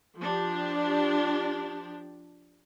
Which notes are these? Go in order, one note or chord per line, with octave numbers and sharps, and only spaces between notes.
F3 D4 G4